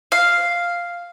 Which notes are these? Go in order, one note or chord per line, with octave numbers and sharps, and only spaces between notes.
F5